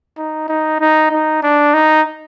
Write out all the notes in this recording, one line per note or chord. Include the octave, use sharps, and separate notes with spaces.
D#4
D#4
D#4
D#4
D4
D#4